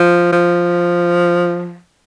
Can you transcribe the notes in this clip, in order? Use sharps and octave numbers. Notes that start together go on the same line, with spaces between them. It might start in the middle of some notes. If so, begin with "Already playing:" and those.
Already playing: F3
F3